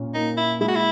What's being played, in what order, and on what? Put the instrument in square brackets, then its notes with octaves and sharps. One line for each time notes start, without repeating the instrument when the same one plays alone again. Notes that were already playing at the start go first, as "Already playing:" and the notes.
Already playing: [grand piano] A#2 C#4
[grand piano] A#3 [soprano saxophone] D#4
[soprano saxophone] E4
[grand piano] G#3 [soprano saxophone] E4
[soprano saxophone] F#4
E4